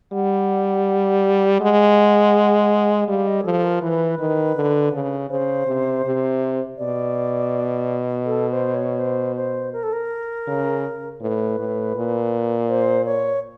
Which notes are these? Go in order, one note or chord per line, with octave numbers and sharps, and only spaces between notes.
G3 F#5
G#3 F#5
G3 F5
D#5
G#4
F3 A4
A#4
E3 B4
D#3
D3
C#3
C#3 C5
C3
C3
B2 D5
A4
C5
C#5
C5
C5
A#4
A4
A#4
C#3
A2 B4
A2
A#2
C5
C#5